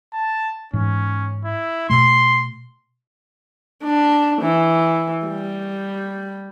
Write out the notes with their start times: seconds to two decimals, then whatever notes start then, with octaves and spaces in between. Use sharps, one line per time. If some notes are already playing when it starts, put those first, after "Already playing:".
0.13 A5
0.73 G#2 E3 C#4
1.45 E4
1.90 B2 A3 C6
3.84 D4
4.42 E3
5.27 G3